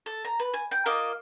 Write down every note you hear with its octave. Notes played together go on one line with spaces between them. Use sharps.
A4
A#5
B4
G#5
G5
A#3 F4 D#5 D6